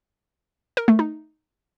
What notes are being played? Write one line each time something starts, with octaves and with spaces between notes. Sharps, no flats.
A#4
A3
D#4